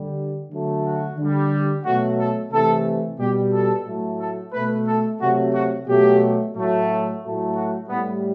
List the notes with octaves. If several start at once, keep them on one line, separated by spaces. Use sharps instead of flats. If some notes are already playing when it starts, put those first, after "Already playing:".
Already playing: D3 G3
D3 F#3 A3
F#4
D3 G3
B2 F#3 A3 F#4
A4
C3 E3 A3 A4
B2 G3 G4
A4
A2 F#3 A3
A4
B2 A3 B4
A4
C3 F#3 A3 F#4
F#4
B2 F#3 A3 G4
A2 F#3 A3
A2 F#3 A3
F#4
A2 G3 B3